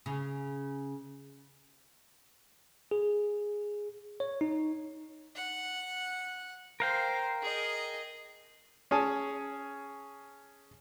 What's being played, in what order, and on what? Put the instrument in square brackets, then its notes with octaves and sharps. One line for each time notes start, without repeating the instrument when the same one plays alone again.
[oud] C#3
[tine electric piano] G#4
C#5
D#4
[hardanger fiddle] F#5
[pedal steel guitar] A#4 F5 G5 [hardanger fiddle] C5
[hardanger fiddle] G#4 D#5
[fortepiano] C#4 G#4 G#5 A5